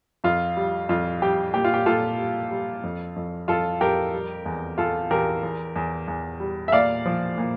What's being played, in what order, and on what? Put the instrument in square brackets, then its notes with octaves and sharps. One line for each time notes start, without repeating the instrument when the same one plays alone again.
[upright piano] F2 F4
G3
F2 F4
G3 G4
A#2 G4
F4
G4
A#2 F4 A4
G3
G3
F2
F2
F2 F4 A4
F2 G4 A#4
G3
E2
E2 F4 A4
E2 G4 A#4
E2
E2
E2
G3
E5
A#2 D5 F5
F3
A#2